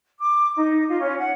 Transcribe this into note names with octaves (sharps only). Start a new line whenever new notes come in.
D6
D#4
F4
C#4
F#5